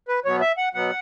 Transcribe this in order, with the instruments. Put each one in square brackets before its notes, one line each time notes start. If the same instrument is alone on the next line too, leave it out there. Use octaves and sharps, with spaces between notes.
[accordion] B4
B2 F#3 B3 C#5
E5
F#5
B2 F#3 B3 F#5